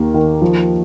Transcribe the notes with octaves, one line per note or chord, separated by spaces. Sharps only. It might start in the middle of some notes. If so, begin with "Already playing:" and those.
Already playing: D#2 D#3 A#3
D#3
F3